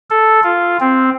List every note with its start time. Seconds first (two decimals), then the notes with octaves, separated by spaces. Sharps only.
0.10 A4
0.44 F4
0.80 C4